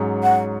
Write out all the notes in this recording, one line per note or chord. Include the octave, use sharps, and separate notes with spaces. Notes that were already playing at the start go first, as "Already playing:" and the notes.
Already playing: G#2 F#3 C#4 G#4 C#5
F#5